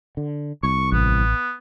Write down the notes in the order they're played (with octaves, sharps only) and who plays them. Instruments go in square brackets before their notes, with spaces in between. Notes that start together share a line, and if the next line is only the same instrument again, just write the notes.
[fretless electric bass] D3
[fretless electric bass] C2 [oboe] C#6
[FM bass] A1 [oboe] B3